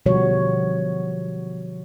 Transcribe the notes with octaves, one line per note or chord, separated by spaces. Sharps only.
B2 D3 F3 G3 F#4 C#5